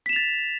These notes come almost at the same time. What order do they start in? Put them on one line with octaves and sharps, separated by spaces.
B6 E7 F7 A6